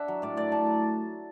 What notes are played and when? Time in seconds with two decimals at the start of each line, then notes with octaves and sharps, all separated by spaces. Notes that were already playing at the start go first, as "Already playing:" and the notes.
Already playing: D4 E5 F#5
0.08 F#3
0.22 A2 D5
0.36 A3 D5
0.52 A2 A5
0.67 F#3